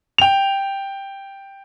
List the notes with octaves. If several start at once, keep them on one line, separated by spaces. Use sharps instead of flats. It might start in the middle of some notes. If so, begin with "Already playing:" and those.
G5 F7